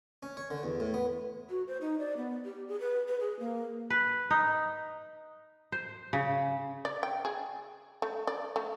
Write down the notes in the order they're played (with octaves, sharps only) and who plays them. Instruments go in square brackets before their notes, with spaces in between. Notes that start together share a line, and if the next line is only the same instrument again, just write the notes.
[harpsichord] C#4
C#5
D3
E2
A2
B3
[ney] F#4
C5
D#4
D5
B3
G4
G#4
B4
B4
G#4
A#3
[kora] B4
D#4
C5
C#3
[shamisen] D5
G5
G#4
A3
D5
A3